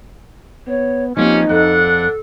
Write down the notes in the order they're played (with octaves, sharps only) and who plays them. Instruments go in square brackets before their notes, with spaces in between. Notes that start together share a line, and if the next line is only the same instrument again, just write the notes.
[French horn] B3 [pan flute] C#5
[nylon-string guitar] F3 A#3 C4 [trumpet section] C#4 [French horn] D#4 [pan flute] G4
[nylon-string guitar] F2 [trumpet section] D4 F#5 [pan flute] A4